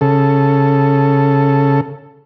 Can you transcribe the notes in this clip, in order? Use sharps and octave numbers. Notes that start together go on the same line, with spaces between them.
C#3 A4